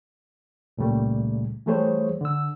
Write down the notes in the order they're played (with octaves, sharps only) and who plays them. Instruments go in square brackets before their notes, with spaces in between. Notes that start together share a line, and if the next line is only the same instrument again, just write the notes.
[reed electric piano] C#2 A#2 C#3 G3 A3
E3 G3 A3 G#4 C5 C#5
D3 E6